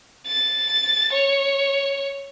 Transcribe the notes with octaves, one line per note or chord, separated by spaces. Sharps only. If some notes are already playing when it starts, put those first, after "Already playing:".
A6
C#5